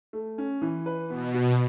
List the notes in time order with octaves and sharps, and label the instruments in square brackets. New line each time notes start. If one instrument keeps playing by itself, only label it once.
[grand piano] A3
C#4
E3
B4
[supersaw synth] B2 [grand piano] B3
[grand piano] F#4